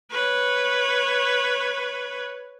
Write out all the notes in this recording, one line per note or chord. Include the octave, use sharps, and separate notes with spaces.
B4 C#5